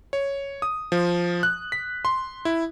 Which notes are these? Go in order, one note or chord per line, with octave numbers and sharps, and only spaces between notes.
C#5
D#6
F3
F#6
B6
C6
E4